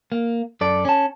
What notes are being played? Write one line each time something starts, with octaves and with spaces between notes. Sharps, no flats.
A#3
F#2 A4 D5
C#4 A5